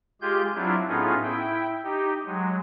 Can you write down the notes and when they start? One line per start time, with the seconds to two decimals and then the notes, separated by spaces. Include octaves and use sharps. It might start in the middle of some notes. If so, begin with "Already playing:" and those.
0.21 G#3 F4 G4 G#4 G6
0.55 F#3 C4 D4 E4 F4
0.88 A2 B3 C#4 D#4 F4 G#4
1.23 E4 G5
1.84 D#4 G4
2.26 F#3 G#3